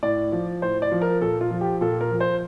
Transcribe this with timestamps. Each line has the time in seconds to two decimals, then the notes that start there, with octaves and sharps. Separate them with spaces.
0.03 A2 D5
0.32 F3
0.62 A2 C5
0.82 D5
0.92 F3
1.02 A#4
1.21 A#2 A4
1.41 F4
1.51 F3
1.61 G4
1.81 A#2 A4
2.01 A#4
2.11 F3
2.20 C5